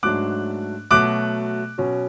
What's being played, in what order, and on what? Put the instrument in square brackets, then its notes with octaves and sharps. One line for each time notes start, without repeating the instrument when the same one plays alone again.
[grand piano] G#2 F#3 A3 D4 D6 F#6
B2 F#3 A3 D6 F#6
B2 F#3 C#4